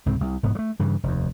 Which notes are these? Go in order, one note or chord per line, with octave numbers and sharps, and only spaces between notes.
C2 G#2 C#3 C4
C2
F1 G#2 B3
F#3 A3
G2 C#3 E3
F1 D#2